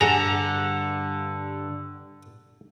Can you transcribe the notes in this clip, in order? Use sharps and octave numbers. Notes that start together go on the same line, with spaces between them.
G2 D3 G#4 F#5 A#5